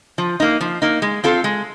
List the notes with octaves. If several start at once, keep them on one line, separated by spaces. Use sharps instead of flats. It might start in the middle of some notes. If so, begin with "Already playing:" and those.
F3
A#3 D#4
F3
A#3 D#4
G#3
C4 F4 A4
G#3